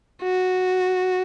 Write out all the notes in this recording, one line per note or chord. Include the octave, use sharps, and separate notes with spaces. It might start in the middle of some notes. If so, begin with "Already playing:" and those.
F#4